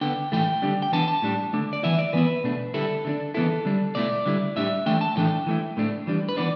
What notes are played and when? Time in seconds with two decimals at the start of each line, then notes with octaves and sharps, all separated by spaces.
0.01 D3 B3 D4 G5
0.32 A2 E3 A3 G5
0.62 D3 G3 D4
0.82 G5
0.92 E3 B3 D4 A5
1.08 A5
1.22 A2 G3 D4
1.53 D3 A3 D4
1.73 D5
1.83 E3 B3 E4 E5
1.99 D5
2.13 E3 B3 E4 B4
2.44 B2 A3 D4
2.74 D3 G3 E4 A4
3.05 D3 G3 D4
3.34 E3 B3 E4 A4
3.65 D3 G3 D4
3.95 B2 A3 E4 D5
4.26 D3 G3 E4
4.56 A2 G3 D4 E5
4.86 E3 A3 D4 G5
5.01 A5
5.16 A2 E3 A3 D4 G5
5.46 E3 A3 E4
5.77 A2 A3 D4
6.07 E3 G3 D4
6.29 B4
6.37 E3 B3 D4 D5